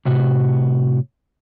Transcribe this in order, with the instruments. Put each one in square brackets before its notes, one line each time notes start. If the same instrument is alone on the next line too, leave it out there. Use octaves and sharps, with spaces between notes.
[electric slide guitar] A2 C3 F#4